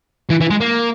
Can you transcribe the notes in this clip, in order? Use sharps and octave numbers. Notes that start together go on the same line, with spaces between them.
E3
E3
G#3
A#3